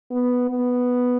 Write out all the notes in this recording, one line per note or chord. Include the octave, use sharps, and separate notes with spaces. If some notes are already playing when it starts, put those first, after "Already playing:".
B3
B3